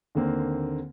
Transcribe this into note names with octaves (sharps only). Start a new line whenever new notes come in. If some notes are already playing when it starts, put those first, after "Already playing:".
D#2 D3 A#3 C4